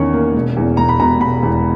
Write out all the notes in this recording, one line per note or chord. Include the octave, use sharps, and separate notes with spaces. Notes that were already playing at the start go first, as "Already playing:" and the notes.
Already playing: E2 D#3 C#4 C#6
A#3
E1
E2
E1 A#5
B5
B2 A#5
E1 B5
E2